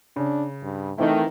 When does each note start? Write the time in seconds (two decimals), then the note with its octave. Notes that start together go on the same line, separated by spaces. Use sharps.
0.16 C#3 D4
0.62 G2
0.98 D#3 E3 A3 C4 E4